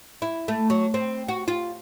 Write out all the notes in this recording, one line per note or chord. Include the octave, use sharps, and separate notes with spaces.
E4
A3
F#3
C4
F#4
F4